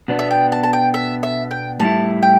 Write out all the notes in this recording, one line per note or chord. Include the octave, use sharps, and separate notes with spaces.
B2 B3 D4
E5
G5
A5
A5
G5
E5
E5
G5
A2 G3 E4 A5
G5